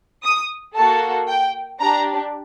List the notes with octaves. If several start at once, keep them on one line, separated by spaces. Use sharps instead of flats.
D#6
A#3 F#4 A4 A5
G5
D4 G4 A#5